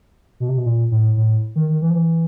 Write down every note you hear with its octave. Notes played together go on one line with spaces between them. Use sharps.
B2
C3
B2
A#2
A2
A2
D#3
D#3
E3
F3
E3